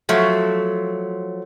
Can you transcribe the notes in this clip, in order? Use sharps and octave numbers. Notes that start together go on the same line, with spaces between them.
F3 F#3 A3